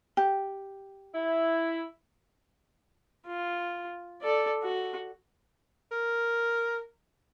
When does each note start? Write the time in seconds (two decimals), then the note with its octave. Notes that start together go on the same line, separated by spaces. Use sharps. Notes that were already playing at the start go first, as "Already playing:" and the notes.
0.17 G4
1.14 E4
3.26 F4
4.22 A4 D5
4.63 F#4
5.91 A#4